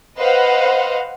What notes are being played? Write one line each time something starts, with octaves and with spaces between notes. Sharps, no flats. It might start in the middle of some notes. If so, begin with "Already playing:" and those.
B4 C5 D#5 F5 F#5